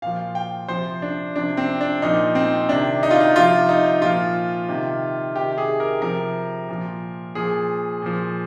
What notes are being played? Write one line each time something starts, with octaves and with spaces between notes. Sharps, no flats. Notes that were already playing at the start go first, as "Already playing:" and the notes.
A#2 F3 F5
G5
C3 F3 C5
D4
C3 F3 D4
C4
D4
A#2 F3 D#4
C4
C3 D#3 D4
D#4
F4
D#4
C3 F3 F4
D#4
A#2 F3 F4
C3 D#3
C3 D#3 G4
G#4
A#4
C3 F3 A#4
A#2 F3
A#2 F3 G#4
A#2 F3